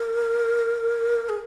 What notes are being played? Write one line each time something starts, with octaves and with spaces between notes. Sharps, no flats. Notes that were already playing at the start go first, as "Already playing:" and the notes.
Already playing: A#4
G#4